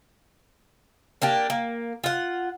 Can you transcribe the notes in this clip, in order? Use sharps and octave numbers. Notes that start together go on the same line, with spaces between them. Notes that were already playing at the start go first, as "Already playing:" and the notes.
A#3 D4 G4
A#3
F4 F#5